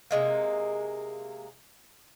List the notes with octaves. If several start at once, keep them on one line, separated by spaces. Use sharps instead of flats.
C3 G#3 A#3